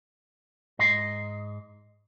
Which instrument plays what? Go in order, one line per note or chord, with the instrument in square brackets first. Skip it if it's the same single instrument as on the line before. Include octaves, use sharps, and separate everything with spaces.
[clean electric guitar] G#2 D#5 C6